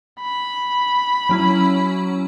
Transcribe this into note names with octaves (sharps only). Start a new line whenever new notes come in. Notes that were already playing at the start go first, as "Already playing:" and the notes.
B5
F#3 C#4 E4